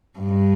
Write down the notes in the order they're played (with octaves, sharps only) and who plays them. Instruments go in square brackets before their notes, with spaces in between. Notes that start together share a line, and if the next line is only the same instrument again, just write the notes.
[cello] G2